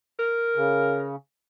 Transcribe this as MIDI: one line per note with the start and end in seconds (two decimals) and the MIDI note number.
0.19 1.08 70
0.56 1.16 49